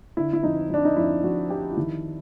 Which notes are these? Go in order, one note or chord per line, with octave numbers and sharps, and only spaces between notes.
D3 E4
E4
F2 D#4
F2 D4
D#4
F2 E4
F2 F#4
F2 G4
F4
D#3 E4